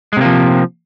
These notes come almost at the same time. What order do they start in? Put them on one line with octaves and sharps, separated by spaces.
G#3 C3 A#3 F3